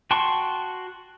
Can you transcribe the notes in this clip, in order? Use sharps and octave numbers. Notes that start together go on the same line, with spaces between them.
F#4 G5 A5 C6 C#6